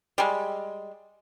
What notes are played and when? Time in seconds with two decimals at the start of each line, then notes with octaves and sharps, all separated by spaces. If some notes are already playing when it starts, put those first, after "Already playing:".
0.18 G3 G#3